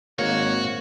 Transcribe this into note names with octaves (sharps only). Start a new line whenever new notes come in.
G#1 A#3 F#4 C#5